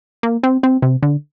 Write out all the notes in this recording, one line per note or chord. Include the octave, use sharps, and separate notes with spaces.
A#3
C4
C4
C3
D3